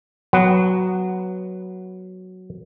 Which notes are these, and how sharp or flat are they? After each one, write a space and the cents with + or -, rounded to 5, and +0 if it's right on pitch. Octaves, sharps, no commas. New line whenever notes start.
F#3 +0 B3 +0 F#5 +0